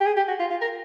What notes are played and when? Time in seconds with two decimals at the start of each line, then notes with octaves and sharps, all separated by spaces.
0.01 G4
0.06 G#4
0.17 G4
0.28 F#4
0.40 F4
0.50 F4
0.61 A#4